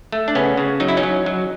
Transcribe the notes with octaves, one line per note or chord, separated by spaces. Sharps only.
A3
D4
C#3 B3 C#4
C#3
F#3 D#4
E4
C#4 D#4
F#3
F#3